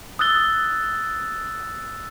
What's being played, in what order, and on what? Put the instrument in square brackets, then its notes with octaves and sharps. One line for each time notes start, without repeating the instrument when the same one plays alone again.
[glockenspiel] D#6 E6 F#6 A6 G7